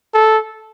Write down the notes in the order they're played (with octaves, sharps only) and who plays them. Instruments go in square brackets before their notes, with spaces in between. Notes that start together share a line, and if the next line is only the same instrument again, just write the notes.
[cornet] A4